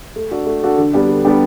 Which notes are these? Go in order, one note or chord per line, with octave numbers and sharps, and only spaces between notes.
A3
D4 F#4 A4
A3
D4 F#4 A4
D3
G3 B3 D4 G4
D3
G3 B3 D4 G4